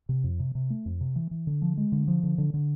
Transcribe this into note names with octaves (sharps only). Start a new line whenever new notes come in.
C3
F2
C3
C3
A3
F2
C3
E3
E3
D3
F3
G#3
D3
F3
D3
D3
D3